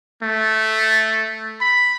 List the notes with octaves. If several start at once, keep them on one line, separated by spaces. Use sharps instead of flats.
A3
B5